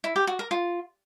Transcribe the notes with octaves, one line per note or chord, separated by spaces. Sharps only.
E4
G4
F#4
A#4
F4